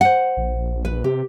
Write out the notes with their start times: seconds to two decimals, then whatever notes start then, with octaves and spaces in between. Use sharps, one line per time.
0.01 C5 F#5
0.37 A#1
0.85 B4
1.04 C3 G4